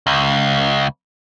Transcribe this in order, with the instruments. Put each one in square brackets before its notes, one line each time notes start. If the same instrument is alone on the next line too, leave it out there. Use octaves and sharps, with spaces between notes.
[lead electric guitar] C#2